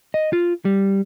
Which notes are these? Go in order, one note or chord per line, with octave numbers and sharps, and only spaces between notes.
D#5
F4
G3